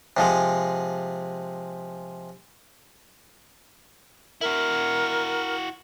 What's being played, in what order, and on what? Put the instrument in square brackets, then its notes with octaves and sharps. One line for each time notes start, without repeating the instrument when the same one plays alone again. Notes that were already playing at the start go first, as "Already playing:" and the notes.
[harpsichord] C3 F3 G#3
[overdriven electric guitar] E4 F#4 [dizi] A#4